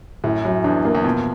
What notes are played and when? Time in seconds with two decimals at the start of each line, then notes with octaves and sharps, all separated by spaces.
0.24 F#2 A2
0.44 F#2 F#3
0.64 E2 D4
0.85 A#3
0.95 E2
1.04 F2 B2